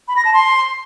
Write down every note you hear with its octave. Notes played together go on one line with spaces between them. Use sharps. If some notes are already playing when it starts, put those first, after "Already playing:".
B5
A#6
A5
C6